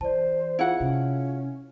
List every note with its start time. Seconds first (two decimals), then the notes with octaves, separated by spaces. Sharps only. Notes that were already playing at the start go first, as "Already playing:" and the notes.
0.01 E3 C5 D5 A5
0.59 E4 F4 G#4 F5 F#5
0.80 C3 C4 C#4